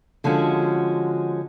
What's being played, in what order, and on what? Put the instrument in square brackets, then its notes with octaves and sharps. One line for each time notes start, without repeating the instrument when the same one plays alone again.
[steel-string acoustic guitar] D3 F3 G#3 C#4 F#4